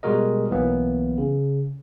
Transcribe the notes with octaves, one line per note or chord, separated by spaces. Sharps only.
B2 G3 G#3 F#4 A#4 D#5
B1 E3 F#3 A#3 B3
C#3